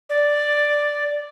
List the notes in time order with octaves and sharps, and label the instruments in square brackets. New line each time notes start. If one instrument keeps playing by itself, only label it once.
[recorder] D5